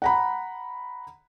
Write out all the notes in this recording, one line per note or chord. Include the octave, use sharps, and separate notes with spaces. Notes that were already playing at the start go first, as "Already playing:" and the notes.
F#5 A#5 B5